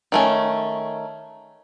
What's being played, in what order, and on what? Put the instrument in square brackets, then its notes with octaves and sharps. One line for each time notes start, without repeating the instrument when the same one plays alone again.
[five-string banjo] D#3 A3 C#4